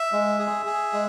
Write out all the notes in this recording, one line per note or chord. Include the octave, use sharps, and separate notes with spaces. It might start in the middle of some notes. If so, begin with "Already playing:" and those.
Already playing: E5
G#3
G#4
G#4
G#3